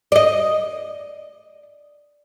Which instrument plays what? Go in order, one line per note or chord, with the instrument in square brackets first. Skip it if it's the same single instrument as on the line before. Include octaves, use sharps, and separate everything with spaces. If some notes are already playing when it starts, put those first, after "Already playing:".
[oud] D5 D#5